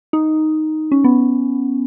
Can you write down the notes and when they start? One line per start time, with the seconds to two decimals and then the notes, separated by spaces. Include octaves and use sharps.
0.13 D#4
0.92 C#4
1.04 B3